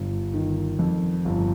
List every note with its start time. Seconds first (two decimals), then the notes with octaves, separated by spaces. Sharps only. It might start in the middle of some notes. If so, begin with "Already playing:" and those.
Already playing: G1
0.34 D#3
0.79 F2
1.25 G1